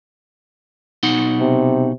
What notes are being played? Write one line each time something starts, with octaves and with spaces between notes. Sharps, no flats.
B2 D#4 F#5
C3